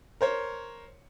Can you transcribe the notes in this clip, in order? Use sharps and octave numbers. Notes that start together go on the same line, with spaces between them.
A#4 C5 C#5